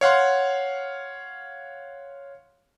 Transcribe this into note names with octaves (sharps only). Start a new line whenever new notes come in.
C#5 F5 F#5 C6